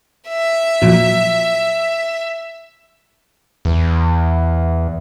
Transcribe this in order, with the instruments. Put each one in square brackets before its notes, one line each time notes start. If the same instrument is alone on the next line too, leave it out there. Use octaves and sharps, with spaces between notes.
[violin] E5
[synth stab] A#2 F3 F#3
[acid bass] E2